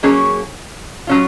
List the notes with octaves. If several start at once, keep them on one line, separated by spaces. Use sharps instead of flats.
F#3 A#3 C#4 G#4 C#5
F#3 C#4 F4